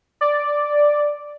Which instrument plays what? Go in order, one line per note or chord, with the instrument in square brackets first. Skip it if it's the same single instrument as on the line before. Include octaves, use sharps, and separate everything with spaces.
[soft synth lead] D5